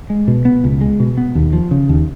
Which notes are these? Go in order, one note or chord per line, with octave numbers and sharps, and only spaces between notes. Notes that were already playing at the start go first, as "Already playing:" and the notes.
G#3
B2
B3
C#2
G#3
B2
B3
D#2
F3
C#3
D#2